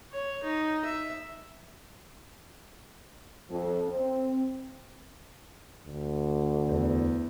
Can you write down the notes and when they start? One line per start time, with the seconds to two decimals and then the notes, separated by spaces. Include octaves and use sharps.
0.12 C#5
0.44 D#4
0.85 E5
3.50 F2
3.88 C4
5.86 D2
6.68 E2